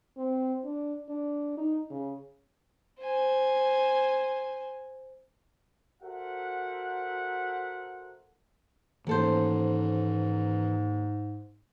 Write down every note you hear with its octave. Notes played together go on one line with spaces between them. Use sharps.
C4
D4
D4
D#4
C#3
C5 G#5
F#4 A4 A#4 C5 E5 F#5
D#2 G#2 E3 C#4 A4 C5